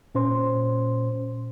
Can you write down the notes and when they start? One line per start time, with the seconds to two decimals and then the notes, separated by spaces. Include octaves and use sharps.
0.15 A#2 C#4 C5 C6